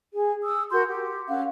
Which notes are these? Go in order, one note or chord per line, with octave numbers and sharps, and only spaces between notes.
G#4
D#6 E6
F#4 A#4 C6 G6
G4
C#4 F5 F#5